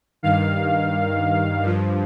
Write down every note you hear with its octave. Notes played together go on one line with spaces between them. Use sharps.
G2 D#3 F5
G2 F3